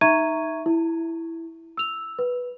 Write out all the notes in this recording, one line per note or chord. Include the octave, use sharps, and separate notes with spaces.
D#4 E5 A#5 C#6 G#6 D#7
E4
E6 F7
B4